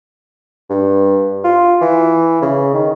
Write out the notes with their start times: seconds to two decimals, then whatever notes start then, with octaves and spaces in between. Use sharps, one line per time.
0.70 G2
1.45 F4
1.81 E3
2.42 C#3
2.74 D#3